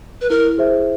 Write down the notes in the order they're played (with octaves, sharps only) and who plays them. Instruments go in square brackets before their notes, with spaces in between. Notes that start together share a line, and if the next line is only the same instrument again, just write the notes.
[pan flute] B4
[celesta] E4 [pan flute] A#4
[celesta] G#4 C5 E5